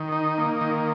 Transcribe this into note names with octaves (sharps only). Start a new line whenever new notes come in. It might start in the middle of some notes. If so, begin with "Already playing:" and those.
Already playing: D#3
D#4
A#3
D#3